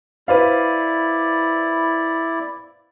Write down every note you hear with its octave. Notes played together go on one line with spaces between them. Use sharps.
E4 B4 C5 D5 F5